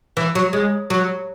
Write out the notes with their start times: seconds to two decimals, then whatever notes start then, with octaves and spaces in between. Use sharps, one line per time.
0.17 E3
0.35 F#3
0.53 G#3
0.90 F#3